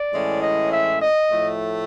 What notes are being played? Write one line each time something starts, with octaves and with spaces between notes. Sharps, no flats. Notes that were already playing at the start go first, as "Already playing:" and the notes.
Already playing: D5
A2 E3 G#3 C#4
D#5
E5
D#5
A2 F3 A3